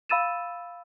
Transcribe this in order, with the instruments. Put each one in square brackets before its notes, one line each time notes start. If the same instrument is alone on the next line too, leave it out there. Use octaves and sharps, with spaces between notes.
[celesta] F5 B5 E6 A6 D#7 E7